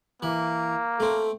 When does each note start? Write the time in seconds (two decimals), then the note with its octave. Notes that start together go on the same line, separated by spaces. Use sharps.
0.22 E3 A#3
1.00 A3 C4 A4